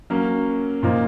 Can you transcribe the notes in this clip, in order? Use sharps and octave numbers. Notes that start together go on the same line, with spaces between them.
F#3 A#3 C#4
A#2 F3 A#3 D#4